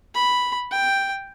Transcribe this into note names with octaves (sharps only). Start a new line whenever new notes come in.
B5
G5